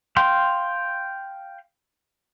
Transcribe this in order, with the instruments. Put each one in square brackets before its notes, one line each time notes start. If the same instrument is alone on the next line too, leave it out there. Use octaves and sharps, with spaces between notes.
[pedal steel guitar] F5 G5 C6